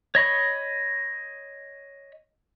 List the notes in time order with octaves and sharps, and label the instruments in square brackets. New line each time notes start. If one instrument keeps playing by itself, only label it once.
[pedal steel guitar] C#5 D#5 B5 C#6